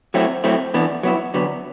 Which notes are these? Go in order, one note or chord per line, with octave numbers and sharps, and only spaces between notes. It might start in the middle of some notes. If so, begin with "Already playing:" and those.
F#3 A3 C4 E4
F#3 A3 C4 E4
E3 B3 D4
F#3 B3 E4
D3 F#3 B3